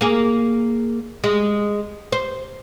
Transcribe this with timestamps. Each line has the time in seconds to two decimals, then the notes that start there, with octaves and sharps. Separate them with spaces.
0.01 A#3 G#4
1.24 G#3
2.12 C5